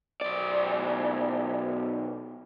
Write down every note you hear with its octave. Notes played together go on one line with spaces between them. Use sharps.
B1 D5